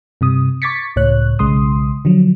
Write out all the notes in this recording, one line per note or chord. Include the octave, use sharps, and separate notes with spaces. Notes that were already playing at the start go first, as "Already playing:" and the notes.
G2 C3 D#6
C#6 D6 G#6 A6 B6 C#7
C#2 A2 C#5 F#6
B1 C#3 G#3 C6 D#6
D3 F3 F#3